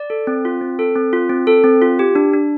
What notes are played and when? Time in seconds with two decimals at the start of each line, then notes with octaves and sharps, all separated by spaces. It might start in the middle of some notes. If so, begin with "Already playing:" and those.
Already playing: D5
0.10 A4
0.27 C4
0.45 F4
0.61 C4
0.79 A4
0.95 C4
1.13 F4
1.30 C4
1.47 A4
1.64 C4
1.82 F4
1.99 G4
2.15 D4
2.33 D4